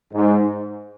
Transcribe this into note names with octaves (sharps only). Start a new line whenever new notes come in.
G#2